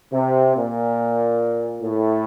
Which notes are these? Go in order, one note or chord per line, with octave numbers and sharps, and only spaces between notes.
C3
A#2
A2